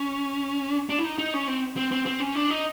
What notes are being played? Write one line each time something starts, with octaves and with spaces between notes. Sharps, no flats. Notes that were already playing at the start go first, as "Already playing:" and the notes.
Already playing: C#4
D4
E4
D#4
D#4
C#4
C4
C4
C4
C4
C#4
D4
D#4